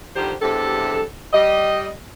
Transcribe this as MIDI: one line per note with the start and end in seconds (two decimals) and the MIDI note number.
0.16 0.33 50
0.16 0.33 51
0.16 0.33 53
0.16 0.33 55
0.16 0.33 67
0.16 0.33 72
0.41 1.02 40
0.41 1.02 43
0.41 1.02 48
0.41 1.02 69
1.33 1.89 55
1.33 1.89 75